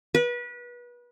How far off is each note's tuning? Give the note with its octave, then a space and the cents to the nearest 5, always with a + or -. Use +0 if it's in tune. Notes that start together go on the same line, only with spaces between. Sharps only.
B4 -30